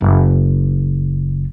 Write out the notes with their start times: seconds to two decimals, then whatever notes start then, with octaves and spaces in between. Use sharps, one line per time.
0.01 F#1 F4